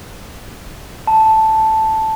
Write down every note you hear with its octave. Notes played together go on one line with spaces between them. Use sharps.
A5